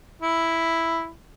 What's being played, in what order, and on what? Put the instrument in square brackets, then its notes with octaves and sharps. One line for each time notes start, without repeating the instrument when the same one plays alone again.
[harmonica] E4